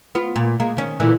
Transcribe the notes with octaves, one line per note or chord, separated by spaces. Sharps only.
B3 F4
A#2
G#3 A#3
D#3 C#4
A#2 D3 E3